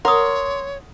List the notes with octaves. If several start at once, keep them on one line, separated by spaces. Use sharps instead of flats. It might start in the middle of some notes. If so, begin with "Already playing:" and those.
A#4 C#5 F#5 C6 D6 D#6